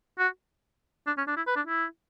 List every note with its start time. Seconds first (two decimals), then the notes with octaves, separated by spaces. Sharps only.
0.19 F#4
1.07 D4
1.18 C#4
1.27 D4
1.37 E4
1.47 B4
1.56 D4
1.67 E4